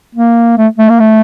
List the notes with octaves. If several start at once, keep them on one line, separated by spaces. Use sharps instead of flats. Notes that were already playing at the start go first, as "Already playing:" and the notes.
A#3
A3
A3
A#3
A3